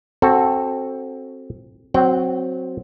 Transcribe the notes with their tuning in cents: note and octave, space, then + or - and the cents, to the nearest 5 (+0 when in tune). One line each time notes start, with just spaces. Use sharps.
C4 +15 F#4 +0 A4 +0
F#3 +0 C4 +0 G5 -40